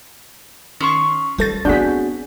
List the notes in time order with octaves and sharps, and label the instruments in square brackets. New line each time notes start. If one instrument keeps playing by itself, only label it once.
[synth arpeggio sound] D#3 [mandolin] C#4 C6 C#6
[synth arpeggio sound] G3 A4 A6 [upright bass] F4
[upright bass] B3 C4 [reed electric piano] D4 F#4 G#4 [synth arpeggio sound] G6 B6